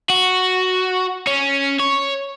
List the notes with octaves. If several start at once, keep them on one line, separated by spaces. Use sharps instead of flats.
F#4
C#4
C#5